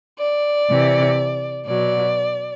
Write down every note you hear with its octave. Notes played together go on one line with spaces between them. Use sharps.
D5
C3 E3
B2 F#3 D5